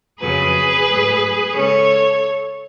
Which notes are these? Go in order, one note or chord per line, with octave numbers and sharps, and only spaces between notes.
F2 C#3 F#3 G#4 B4
G#2 F#3 A3
C#3 G#3 C#4 A4 C#5